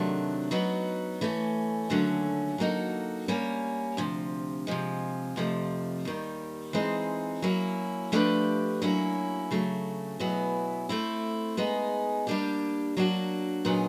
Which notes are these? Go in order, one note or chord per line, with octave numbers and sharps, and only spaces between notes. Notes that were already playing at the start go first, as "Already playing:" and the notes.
Already playing: C3 D#3 F#3 A3 D4
F#3 B3 D#4 F#4
E3 A3 C#4
D#2 D3 F#3 A3 C#4
F#3 A#3 D#4 F#4 A4
G3 A#3 C#4
D2 C3 F3
C3 F3 G#3
F2 C3 F3 A3
D#2 D#3 G3
E3 G#3 C4 D#4
F#3 A#3 C#4 E4
F3 A3 D4 G4 B4
F#3 A#3 C#4 E4
C#3 F#3 A3
B2 F#3 B3 E4 G#4
A3 C4 E4
G#3 B3 D#4 G#4
G3 A#3 D4 G4
F#3 A#3 D4 F#4
A#2 F#3 B3 D#4 G#4